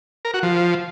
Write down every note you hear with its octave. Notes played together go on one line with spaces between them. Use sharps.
A#4
F#4
F3